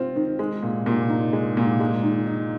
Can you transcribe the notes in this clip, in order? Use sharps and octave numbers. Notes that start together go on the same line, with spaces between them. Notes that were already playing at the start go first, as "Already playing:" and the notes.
Already playing: C4 F4
D#3
G#3
A#2
A#2
D#4
G#3
A#2
G#3
D#3
D#4